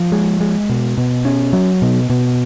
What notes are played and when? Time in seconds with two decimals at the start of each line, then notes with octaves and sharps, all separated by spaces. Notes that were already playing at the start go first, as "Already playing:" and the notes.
Already playing: F3
0.12 G#3
0.41 G#3
0.69 B2
0.98 B2
1.25 C#4
1.53 F#3
1.82 B2
2.10 B2